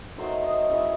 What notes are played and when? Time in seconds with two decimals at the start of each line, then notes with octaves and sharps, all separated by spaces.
0.17 D#3 F#3 A3 C5
0.44 D#5
0.70 C#3 E3 G#3 E5